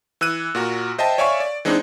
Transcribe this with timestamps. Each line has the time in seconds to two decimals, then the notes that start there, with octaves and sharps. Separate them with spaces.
0.21 E3 E6 F#6 D#7
0.55 A#2 F#4 A#4
0.98 C5 D#5 E5 G5 A5
1.18 C#5 D5 E5 F5 G#5 C#6
1.40 D5
1.65 E3 G#3 C4 D4 D#4